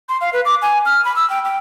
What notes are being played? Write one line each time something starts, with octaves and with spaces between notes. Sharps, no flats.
C6
F5
B4
D6
G#5
F6
B5
E6
G5
G5